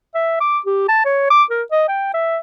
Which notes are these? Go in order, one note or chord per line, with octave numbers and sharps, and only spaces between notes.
E5
D6
G4
A5
C#5
D6
A#4
D#5
G5
E5